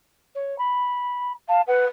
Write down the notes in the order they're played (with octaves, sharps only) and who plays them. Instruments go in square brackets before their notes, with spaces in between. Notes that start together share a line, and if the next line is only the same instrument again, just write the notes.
[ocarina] C#5
B5
[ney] F5 [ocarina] A5
[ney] B4 [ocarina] F#5